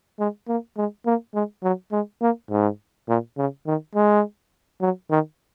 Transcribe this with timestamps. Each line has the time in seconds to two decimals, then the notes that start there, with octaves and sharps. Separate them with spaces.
0.19 G#3
0.48 A#3
0.77 G#3
1.06 A#3
1.34 G#3
1.63 F#3
1.92 G#3
2.21 A#3
2.50 G#2
3.09 A#2
3.37 C#3
3.66 D#3
3.95 G#3
4.81 F#3
5.11 D#3